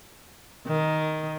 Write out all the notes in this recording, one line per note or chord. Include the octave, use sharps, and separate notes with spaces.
D#3